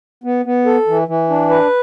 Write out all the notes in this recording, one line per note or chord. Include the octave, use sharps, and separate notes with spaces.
B3
B3
A4
E3
E3
D4
B4